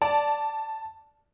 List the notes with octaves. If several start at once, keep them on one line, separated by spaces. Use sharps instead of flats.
D5 A5